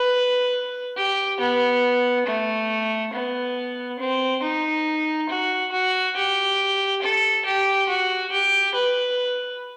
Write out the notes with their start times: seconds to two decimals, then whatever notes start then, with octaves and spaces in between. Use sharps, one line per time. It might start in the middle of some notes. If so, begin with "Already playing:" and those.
Already playing: B4
0.97 G4
1.40 B3
2.27 A3
3.13 B3
3.99 C4
4.42 D#4
5.29 F#4
5.72 F#4
6.16 G4
7.02 A4
7.46 G4
7.89 F#4
8.32 G4
8.75 B4